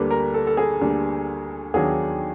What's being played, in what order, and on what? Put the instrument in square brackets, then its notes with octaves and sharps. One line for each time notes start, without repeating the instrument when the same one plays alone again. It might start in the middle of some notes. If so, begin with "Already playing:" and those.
Already playing: [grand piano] D2 D3 G3 A#3 D4 B4
A#4
A4
A4
G#4
D2 D3 G3 A#3 D4
D#2 D#3 F#3 B3 D4 G#4